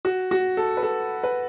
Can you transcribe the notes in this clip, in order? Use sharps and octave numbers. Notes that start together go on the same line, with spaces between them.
F#4
F#4
A4
B4
A4
B4